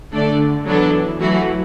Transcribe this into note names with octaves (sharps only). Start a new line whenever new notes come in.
D3 A3 D4 A4 D5
E3 F#3 B3 D4 A4
E3 F#3 A3 F#4